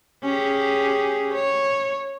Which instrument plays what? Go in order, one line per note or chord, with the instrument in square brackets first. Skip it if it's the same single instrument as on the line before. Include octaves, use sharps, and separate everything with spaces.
[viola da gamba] C#4 G4 G#4
C#5